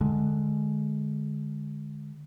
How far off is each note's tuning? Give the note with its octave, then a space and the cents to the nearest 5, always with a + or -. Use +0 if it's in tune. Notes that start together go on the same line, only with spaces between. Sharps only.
D3 +20 G#3 +10